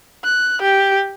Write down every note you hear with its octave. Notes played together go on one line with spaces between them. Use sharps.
F#6
G4